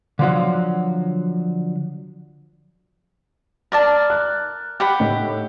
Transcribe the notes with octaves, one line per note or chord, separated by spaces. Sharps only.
D3 F3 F#3
A#4 D5 A5
F#6
G4 F#5 B5
A2 D#4